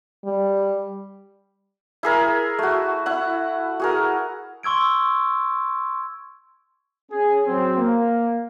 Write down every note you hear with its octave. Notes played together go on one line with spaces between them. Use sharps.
G3
E4 G#4 A#4
A3 F#4
E4 F#5
F#4 G#4 A#4
C6 C#6 E6 G#6 D7
C#4 G#4
F#3 C4
A#3